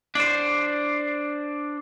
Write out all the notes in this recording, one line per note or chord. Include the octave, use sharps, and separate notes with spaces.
D4 C5